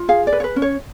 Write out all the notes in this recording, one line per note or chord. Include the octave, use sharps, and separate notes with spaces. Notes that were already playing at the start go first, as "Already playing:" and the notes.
Already playing: F4
G#4 F5
D5
B4
C#5
B4
C#4
C#5